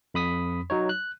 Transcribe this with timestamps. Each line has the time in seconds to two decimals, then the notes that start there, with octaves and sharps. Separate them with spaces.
0.14 F2 B5 D#6 B6
0.70 F#3 D#4 C#5
0.89 F#6